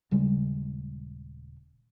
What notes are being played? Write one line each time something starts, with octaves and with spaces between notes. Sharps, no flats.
D#1 C#3 G3 G#3